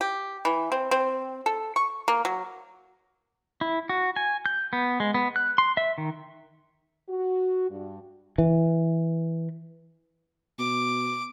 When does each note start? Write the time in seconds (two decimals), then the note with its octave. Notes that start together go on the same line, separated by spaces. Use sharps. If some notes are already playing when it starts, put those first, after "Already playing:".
0.01 G4
0.45 E3
0.72 C4
0.91 C4
1.46 A4
1.76 C#6
2.08 A#3
2.25 F#3
3.61 E4
3.89 F#4
4.16 G#5
4.46 G6
4.73 B3
5.00 G#3
5.14 B3
5.36 F#6
5.58 C6
5.77 E5
5.98 D#3
7.09 F#4
7.70 G2
8.38 E3
10.59 B2 D6